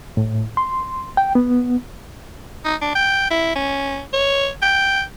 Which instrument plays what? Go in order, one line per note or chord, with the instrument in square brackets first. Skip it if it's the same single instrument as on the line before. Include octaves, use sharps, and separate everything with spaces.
[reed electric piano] A2
C6
G5
B3
[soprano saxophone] D#4
D4
G5
E4
C#4
C#5
G5